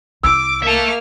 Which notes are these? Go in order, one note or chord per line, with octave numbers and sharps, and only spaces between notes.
C2 E4 D6 E6
A#3 E5 A5 F6